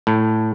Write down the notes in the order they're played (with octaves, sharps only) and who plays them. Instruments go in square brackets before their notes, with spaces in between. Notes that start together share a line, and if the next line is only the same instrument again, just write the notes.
[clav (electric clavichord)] A2